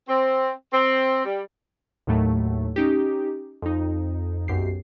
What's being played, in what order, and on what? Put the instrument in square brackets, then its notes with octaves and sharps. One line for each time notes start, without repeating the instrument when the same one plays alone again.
[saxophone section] C4
C4
G3
[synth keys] D#2 A2 F#3 A3
C#4 D#4 G4
F2 D#4
B1 F#2 G4 C7